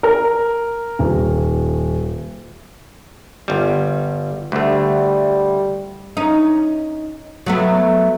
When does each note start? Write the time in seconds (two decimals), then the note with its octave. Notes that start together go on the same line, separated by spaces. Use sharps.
0.03 A#4
0.99 D#1
3.48 G1 G3
4.52 D2 G3 A3
6.17 C#4 D#4
7.46 F#3 A3 B3